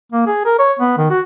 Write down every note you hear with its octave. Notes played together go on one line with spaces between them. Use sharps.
A#3
G#4
A#4
C#5
B3
D#3
F#4